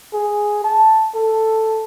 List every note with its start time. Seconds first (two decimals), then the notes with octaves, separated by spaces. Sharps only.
0.13 G#4
0.64 A5
1.15 A4